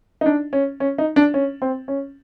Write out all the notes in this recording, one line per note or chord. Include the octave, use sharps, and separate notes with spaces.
D#4
D4
C#4
C#4
D#4
D4
C#4
C4
C#4